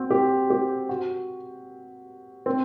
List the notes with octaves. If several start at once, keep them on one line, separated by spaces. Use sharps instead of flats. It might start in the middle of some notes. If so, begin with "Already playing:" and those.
Already playing: C4 F#4
G4
G4
F#4
C4